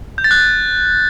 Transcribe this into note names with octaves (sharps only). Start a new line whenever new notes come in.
G6
A6
F#6